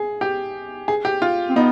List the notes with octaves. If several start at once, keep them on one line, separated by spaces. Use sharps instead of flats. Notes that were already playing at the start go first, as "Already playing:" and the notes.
Already playing: G#4
G4
G#4
G4
F4
C4
B3 D#4